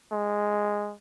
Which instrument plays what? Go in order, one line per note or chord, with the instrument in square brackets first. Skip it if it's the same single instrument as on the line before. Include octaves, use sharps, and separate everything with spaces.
[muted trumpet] G#3